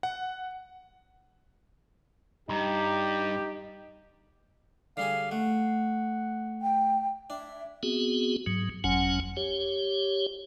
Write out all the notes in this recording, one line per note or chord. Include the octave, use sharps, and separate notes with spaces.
F#5
G2 D#4 G4 A#5
D3 G3 G#4 F5
A3 F#5
G5
D4 E5
B3 C4 F#4 G#4
G#2 F#3
F#1 F2 F#3 C#4 F#5 G#5
G4 C#5